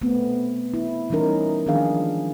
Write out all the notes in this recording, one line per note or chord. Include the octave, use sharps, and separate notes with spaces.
A3 B3 C4
E4
E3 G3 C#4 D#4 A#4
D#3 F3 G#3 D4 G#4 F5